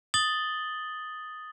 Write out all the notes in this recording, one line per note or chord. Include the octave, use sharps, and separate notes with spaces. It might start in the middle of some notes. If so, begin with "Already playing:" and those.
D#6 A6 F#7 G7